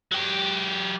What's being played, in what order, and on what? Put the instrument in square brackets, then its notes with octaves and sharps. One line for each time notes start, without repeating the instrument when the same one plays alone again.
[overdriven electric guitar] F#3 G4